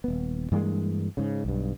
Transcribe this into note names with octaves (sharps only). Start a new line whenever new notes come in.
D#1 B3
G2 E3 G#3 A#3
G#2 C#3
B1 G2